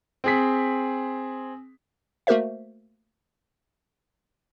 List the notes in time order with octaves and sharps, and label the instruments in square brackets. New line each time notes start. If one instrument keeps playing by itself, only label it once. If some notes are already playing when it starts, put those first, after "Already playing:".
[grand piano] C4 G#4 B6
[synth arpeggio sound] A3 A#3 F#4 A#4 C5 E5